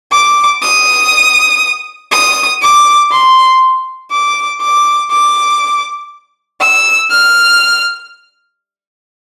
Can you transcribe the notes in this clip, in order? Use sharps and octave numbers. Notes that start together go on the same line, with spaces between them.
D6
D#6
D#6
D6
C6
D6
D6
D6
E6
F6